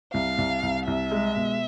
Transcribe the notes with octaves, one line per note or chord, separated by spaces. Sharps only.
C2 F5
C2
C2
C2 E5
G#3
B2